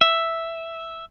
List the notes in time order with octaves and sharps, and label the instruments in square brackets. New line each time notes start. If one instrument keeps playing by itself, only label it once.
[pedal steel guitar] E5